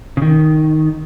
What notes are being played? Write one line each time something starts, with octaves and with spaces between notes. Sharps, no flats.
C#3
D#3